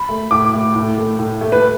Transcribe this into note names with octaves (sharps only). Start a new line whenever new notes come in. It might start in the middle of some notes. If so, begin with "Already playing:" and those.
Already playing: B5
A3
A2 D6
A3
A2
A3
A2
A3
B4